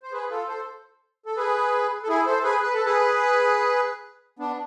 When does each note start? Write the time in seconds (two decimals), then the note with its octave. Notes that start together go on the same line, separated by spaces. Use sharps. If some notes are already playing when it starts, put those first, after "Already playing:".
0.03 C5
0.12 G#4 B4
0.30 F4 A4
0.48 A4 C5
1.26 A4
1.37 G#4 B4
2.03 A4
2.08 E4 G#4
2.26 A4 C5
2.44 G#4 B4
2.62 B4
2.74 A4
2.85 G#4 B4
4.39 B3 D4